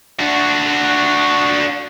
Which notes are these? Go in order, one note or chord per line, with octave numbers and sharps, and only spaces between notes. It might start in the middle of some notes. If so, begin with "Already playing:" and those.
D4 F#4